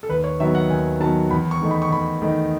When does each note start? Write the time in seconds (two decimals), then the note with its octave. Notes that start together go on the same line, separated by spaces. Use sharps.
0.03 A4
0.09 D#2 B4
0.24 C#5
0.40 D#3 F#3 B3 E5
0.55 F#5
0.70 D#2 G#5
1.00 D#3 F#3 B3 A5
1.30 E2 B5
1.51 C#6
1.61 D#3 A3 D#4
1.71 B5
1.82 C#6
1.90 E2 B5
2.22 D#3 A3 D#4